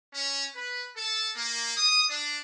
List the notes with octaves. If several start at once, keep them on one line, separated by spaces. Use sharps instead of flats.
C#4
B4
A4
A#3
D#6
D4